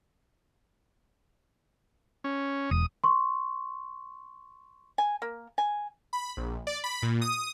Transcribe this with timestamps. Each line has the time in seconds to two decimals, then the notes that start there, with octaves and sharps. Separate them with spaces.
2.24 C#4
2.71 E1 D#6
3.04 C6 C#6
4.98 G#5
5.22 A#3
5.58 G#5
6.13 B5
6.37 A#1
6.67 D5
6.84 B5
7.02 A#2
7.22 D#6